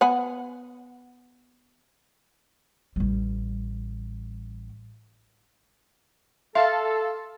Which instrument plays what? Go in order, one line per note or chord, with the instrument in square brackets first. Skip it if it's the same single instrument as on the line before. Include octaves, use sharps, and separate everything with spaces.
[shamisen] B3 F#5 G#5
[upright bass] A1 G3
[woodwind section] A4 [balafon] E5 [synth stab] F5 A5 [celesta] C6